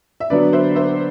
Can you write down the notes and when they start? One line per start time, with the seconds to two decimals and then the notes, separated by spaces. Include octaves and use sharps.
0.20 E5
0.30 D3 F#3 B3 B4 D5
0.53 C5 E5
0.76 C5 E5